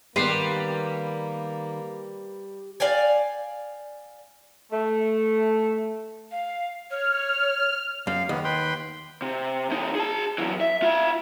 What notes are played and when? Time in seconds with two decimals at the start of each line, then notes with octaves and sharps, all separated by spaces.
0.16 D#3 G3 A#3 B3 B4 C6
2.80 D5 F5 G5 G#5
4.72 A3
6.32 F5
6.91 C#5 F6
8.07 F#2 F5
8.29 D#2 B3
8.44 B4 G5 C6
9.22 C3
9.70 E2 D#4
9.95 G#4 A5
10.38 F#2 E3
10.61 E5
10.82 F4 E5